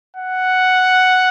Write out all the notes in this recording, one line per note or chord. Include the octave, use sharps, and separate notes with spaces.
F#5